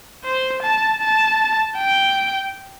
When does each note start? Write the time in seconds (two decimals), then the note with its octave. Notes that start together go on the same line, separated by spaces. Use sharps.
0.24 C5
0.63 A5
1.01 A5
1.78 G5